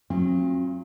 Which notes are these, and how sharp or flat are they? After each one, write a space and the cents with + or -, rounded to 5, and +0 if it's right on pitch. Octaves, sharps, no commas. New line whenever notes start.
F#3 -30 C4 +45 F4 -35